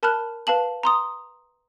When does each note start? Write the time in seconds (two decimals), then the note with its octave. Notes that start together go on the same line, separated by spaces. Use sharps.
0.03 A#4 A5 B5 F6 F#6
0.47 B4 F5 A5 F#7
0.83 A#5 C6 D#6